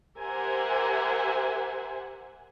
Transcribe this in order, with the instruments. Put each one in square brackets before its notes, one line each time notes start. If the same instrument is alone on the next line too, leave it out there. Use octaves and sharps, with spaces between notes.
[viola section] G4 A#4 C5 E5 F#5 G#5